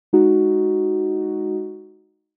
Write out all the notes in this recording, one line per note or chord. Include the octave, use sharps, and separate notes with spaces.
G#3 D#4 F#4